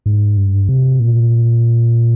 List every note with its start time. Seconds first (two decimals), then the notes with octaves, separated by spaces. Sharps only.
0.06 G#2
0.37 G2
0.69 C3
1.00 A#2